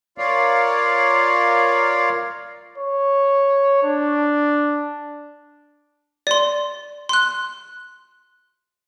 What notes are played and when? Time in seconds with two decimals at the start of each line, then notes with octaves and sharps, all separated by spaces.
0.18 F4 A#4 C#5 D5 F5
2.78 C#5
3.83 D4
6.27 D5 C6
7.09 C6 F#6